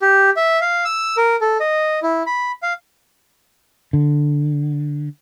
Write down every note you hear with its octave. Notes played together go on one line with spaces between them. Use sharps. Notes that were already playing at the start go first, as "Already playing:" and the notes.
G4
E5
F5
E6
A#4
A4
D#5
E4
B5
F5
D3